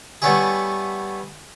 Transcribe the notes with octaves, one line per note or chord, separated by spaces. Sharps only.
G3 A3 B3 C#4 E4 G#4